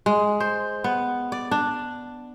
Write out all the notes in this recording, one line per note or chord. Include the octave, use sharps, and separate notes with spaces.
G#3
C5
B3
D5
D4